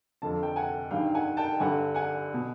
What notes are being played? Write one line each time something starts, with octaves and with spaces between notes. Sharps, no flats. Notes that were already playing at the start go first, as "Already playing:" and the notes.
F2 D3 A5
G5 A5
F#5 G#5
G2 D#3 F5 G5
F#5 G#5
G5 A5
G2 D3 F#5 G#5
F#5 G#5
B2